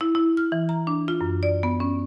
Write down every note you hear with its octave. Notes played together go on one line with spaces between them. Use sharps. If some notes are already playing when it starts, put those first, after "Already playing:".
E4
E4
F6
E3
A#5
D4
F4
F#2
D5
B3
C#4